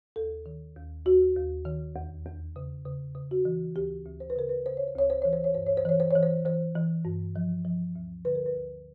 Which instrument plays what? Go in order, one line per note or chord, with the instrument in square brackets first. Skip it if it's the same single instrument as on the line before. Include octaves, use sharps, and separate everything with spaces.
[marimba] D#2 A4
D#3
D#2
D#2 F#4
D#2
D#3
E2
E2
C#3
C#3
C#3
F#4
E3
D2 G4
D2
C5
B4
C#3 A#4
B4
C#3 C5
C#5
C5
D2 C#5
C5
E3 C#5
C5
C#5
G2 C5
C#5
C5
E3 C#5
C5
E3 C#5
C5
E3 C5
E3
G2
F3
F3
D2
D3 B4
A#4
B4
D2